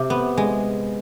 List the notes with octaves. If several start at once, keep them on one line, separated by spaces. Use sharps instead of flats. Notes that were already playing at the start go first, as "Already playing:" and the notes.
Already playing: C3
B3
G#3